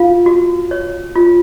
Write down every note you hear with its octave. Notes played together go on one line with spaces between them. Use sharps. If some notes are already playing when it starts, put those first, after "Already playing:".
Already playing: F4 F5
F#4
C#5
F4